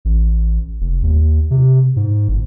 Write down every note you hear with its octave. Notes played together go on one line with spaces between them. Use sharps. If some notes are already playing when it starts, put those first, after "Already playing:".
A1
F1
D#2
C3
G#2
G1